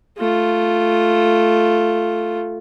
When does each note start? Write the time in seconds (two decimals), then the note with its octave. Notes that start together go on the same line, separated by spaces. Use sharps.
0.17 A3 F4